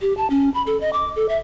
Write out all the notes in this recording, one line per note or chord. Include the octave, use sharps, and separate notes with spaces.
G4
A5
C#4
B5
A4
D#5
D6
A4
E5